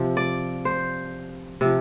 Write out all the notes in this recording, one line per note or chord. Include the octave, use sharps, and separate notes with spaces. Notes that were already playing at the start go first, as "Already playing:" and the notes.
Already playing: C3 F3
D5
C5
C3 F3